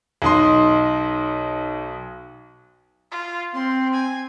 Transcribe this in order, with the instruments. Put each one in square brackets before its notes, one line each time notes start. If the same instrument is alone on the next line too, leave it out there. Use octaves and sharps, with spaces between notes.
[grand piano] B1 D#4 C6
[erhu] F4
[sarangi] C4 [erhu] C6
[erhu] G#5